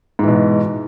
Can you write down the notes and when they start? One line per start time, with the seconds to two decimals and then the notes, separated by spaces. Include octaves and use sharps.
0.19 G#2
0.23 E3
0.28 B2